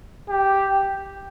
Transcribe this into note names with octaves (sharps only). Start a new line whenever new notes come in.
G4